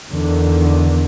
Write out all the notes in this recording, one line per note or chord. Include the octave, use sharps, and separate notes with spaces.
E2 D3 D#3